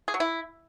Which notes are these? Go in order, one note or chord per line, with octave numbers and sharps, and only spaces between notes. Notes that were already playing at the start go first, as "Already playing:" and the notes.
G#4
F#3
E4